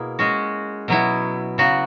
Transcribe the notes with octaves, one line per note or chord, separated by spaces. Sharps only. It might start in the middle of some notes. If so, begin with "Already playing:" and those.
Already playing: B2 A#3 E4 G#4
G#3 C#4 F#4
B2 F#3 B3 E4
C#3 F#3 B3 F#4